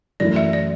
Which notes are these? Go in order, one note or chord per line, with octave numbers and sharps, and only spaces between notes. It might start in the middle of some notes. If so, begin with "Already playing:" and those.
F#2 E3 A3 E4 D5
E5
D5